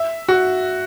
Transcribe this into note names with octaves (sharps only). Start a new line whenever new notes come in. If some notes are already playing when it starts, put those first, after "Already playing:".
Already playing: E5
F#4